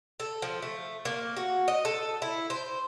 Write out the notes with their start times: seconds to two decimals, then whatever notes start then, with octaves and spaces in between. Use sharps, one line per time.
0.20 A4
0.42 F3
0.62 A3
1.05 A#3
1.36 F#4
1.68 D#5
1.85 A4
2.22 E4
2.50 C5